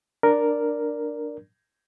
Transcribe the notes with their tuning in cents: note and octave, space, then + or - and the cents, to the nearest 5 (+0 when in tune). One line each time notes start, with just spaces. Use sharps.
D4 +15 A#4 +0 D5 +0